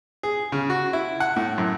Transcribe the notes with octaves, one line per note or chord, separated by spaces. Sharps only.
G#4
C#3
F#4
E4
F#5
A2
F#2